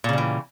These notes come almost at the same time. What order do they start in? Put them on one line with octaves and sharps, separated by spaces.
A#2 C#3 G3 E3